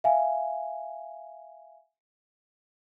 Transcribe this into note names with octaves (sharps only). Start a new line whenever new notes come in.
E5 F5 G#5